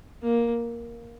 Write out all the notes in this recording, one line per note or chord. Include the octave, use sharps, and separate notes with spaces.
A#3